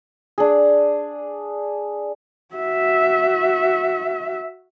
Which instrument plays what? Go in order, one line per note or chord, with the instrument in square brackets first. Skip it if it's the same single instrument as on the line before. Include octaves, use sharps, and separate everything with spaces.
[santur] D4 G#4
[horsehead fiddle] F#4 E5